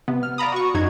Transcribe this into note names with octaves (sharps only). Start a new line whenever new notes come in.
C3 B3
F6
D5 F5 A#5 B5 D#6
F#4 C#6
F#2 D#4 F#4 G#6